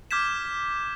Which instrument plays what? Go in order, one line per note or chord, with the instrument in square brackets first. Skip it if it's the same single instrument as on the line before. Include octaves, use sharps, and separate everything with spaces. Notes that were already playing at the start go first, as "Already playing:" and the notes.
[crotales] D6 F6 G6 G#6 B6 E7